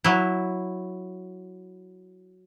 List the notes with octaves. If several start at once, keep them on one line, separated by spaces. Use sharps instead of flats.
F#3 E4